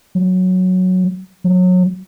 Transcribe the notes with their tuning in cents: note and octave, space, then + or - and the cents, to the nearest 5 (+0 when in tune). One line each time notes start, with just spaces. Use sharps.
F#3 -5
F#3 -25